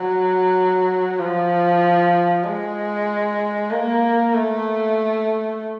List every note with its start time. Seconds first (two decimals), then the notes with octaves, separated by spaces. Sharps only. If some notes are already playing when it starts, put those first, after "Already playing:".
Already playing: F#3
1.19 F3
2.44 G#3
3.71 A#3
4.34 A3